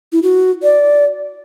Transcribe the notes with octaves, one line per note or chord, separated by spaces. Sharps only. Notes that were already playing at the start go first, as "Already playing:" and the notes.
E4
F#4
D5